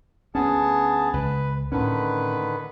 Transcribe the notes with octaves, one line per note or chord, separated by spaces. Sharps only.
D2 B3 C#4 G#4 A5
C#2 B4
A2 D3 D#3 C#4 B4